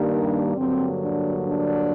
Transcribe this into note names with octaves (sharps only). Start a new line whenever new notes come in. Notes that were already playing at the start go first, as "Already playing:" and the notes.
Already playing: G2 D#3 G3 A#3
D4
G2 D3 F#3 A#3 C4
D4
D4